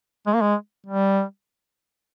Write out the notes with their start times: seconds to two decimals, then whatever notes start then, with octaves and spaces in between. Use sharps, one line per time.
0.27 G#3
0.34 A#3
0.41 G#3
0.86 G3